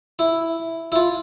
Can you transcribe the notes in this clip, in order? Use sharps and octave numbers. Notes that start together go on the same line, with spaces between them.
E4
E4
F4